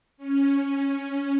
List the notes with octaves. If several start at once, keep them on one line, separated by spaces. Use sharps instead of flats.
C#4